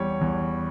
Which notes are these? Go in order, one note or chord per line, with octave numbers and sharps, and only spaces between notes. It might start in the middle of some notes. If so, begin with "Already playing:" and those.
Already playing: E2 G3 C#5 C#6
E2